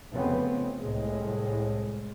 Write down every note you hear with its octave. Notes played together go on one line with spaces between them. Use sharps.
F1 F2 C#3 B3 C4
C2 A2 G#3